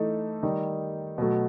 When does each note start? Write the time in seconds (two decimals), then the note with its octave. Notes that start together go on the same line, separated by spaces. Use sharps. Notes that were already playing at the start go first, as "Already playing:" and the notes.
Already playing: E3 A3 D#4 A4
0.43 D#3 G3 D#4
1.18 B2 F#3 A3